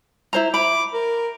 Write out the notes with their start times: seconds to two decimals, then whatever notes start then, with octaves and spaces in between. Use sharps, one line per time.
0.33 E4 C5 A#5
0.54 B5 D6
0.93 A#4